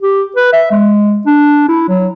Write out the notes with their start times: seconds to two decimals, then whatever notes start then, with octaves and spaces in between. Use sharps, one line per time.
0.02 G4
0.36 B4
0.53 E5
0.72 G#3
1.26 D4
1.69 E4
1.89 F#3